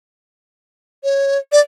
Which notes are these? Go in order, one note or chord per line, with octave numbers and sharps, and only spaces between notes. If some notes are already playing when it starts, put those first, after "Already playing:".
C#5
D5